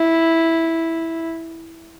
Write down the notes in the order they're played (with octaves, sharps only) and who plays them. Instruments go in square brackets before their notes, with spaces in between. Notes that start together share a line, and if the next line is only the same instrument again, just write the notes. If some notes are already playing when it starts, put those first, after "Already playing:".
Already playing: [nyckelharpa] E4